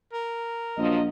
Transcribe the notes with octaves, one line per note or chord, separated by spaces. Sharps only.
A#4
A#1 F3 F#3 D#5